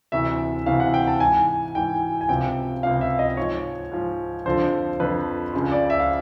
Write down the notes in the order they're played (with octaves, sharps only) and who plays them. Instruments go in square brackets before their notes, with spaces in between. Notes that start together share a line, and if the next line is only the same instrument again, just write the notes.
[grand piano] D2 C3 E3 E5
D2 C3 E3 F5
F#5
G5
A5
G#2 E3 G#5
G#2 E3 G5
G#5
C#2 C3 F3 G5
C#2 C3 F3 F5
E5
D#5
G#2 F3 C#5
G#2 F3
F2 D3 F3 C5
F2 D3 F3 B4
C#2 C#3 F3
D5
E5
F5